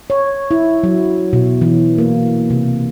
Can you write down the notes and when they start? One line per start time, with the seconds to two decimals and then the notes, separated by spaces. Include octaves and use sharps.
0.10 C#5
0.51 E4
0.83 F#3
1.33 B2
1.61 E3
1.98 A#3
2.50 C3